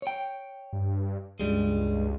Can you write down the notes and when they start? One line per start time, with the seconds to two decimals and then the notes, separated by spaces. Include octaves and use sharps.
0.02 C#5 G5
0.73 G2
1.40 C#2 G2 G3 G#3